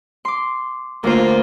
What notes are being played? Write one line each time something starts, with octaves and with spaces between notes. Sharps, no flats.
C6 D6
D2 A#3 F4 C5